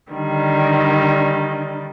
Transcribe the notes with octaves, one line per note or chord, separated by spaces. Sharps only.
D3 D#3 G3